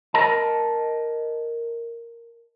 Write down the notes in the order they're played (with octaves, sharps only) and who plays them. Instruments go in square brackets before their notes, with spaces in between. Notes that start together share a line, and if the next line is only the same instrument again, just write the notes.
[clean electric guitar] A#4 D#5 A5